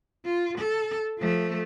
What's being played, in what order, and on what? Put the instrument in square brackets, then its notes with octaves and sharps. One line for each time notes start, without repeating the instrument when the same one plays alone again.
[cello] F4
A4
F3 A3